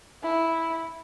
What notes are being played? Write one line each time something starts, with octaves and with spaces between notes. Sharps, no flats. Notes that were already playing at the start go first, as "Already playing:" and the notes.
E4